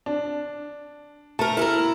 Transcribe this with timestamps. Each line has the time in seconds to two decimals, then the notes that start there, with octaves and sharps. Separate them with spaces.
0.06 D4
1.39 A3 A#4 A5
1.57 E4 A4 A#4